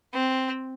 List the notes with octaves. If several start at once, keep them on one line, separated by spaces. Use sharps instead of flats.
C4